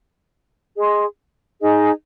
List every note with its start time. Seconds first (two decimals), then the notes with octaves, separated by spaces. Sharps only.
0.75 G#4 D#5 C6
1.61 D#4 G#4 D#5